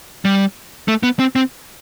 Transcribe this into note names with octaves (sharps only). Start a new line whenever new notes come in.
G3
A3
B3
C4
C4